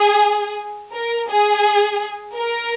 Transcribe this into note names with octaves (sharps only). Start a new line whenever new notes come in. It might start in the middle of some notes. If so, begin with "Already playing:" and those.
Already playing: G#4
A#4
G#4
A#4